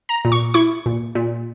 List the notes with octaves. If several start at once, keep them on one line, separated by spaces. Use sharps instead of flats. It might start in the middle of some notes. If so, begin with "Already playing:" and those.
A#5
A#2
C#6
E4 C#6
A#2
A#2